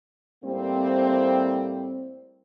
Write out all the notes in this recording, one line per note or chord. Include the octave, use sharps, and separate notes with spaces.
A2 G3 A#3 C4